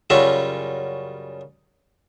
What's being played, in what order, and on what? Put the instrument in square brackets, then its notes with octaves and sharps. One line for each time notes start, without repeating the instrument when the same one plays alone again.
[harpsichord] F#2 C#3 G3 F4 F#4 E5